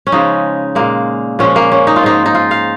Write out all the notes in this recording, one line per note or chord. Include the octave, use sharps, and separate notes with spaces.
C#4
C#3 F3 G#3 D#4
A#2 G#3 A#3
A#2 F3 G#3 C#4
A#3
C#4
D#4
F4
G#2 F3 G#3 D#4
D#4
F4
F5